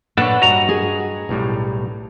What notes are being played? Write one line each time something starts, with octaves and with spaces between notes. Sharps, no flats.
A#2 D4 A4 B4 C#5 F#5
G2 F#4 D#5 A#5
G#4
B1 A2 G3